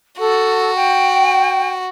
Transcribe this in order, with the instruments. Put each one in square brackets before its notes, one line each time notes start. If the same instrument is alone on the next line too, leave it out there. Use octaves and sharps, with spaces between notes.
[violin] F#4 [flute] A4
[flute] G5